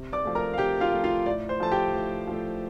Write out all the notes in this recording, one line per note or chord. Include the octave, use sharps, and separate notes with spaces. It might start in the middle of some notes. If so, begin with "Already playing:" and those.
Already playing: C3
D5 D6
F3 A3
A#4 A#5
F5
C3 G4 G5
F4 F5
F3 A3
F4 F5
A2 D5
C5
F3 A3 A5
G4 G5
A2
F3 A3